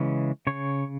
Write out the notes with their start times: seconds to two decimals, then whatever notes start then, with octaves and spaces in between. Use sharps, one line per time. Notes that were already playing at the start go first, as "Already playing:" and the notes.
Already playing: C#3 E3 G#3 C#4
0.47 C#3 C#5